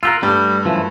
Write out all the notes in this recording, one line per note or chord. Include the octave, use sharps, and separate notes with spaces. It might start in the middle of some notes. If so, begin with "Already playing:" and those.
F4 G4 A#4 E6 F#6
G2 G3 A3
F#2 E3 F3